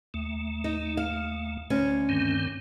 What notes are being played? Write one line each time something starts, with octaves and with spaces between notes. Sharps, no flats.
D#2 A3
D#4
F5
D2 C#4
G2 D#3 C4